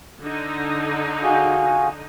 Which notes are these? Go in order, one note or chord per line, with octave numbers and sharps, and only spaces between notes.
D3 D#4
F4 F#4 G#4